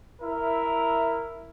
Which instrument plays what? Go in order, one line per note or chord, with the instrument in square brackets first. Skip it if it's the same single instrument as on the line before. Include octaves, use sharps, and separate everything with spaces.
[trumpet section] E4 A#4 E5